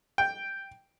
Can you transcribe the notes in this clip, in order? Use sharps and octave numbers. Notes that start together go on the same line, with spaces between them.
G5